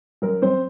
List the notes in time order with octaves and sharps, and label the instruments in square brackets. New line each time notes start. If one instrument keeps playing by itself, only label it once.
[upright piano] F#2 A#4
F#2 C4 C5